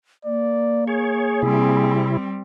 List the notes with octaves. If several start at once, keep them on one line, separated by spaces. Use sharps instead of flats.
A#3 D5
G#4 C#5
C3 G3 C4 E4